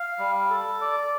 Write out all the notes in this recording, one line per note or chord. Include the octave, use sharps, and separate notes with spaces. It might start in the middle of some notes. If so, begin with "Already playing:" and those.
Already playing: F5
G3
A4
D5